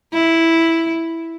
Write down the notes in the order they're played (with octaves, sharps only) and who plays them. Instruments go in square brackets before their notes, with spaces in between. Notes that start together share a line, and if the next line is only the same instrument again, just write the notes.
[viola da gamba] E4